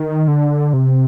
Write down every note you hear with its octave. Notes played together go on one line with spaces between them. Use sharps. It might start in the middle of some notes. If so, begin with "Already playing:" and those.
Already playing: D#3
D3
C3